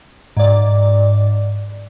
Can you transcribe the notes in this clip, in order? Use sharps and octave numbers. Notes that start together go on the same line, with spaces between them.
G#2 D5